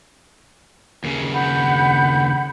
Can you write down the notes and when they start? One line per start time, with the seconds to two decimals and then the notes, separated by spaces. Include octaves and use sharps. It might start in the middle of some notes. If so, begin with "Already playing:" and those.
1.04 D#2 C#3
1.32 F#5 B5 G6